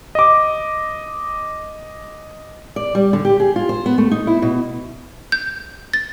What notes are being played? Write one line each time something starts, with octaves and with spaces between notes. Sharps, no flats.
D#5 D6
D5
G3
D3
G4
G#4
F4
C5
B3
A3
D#4
E4
B2
G6
A6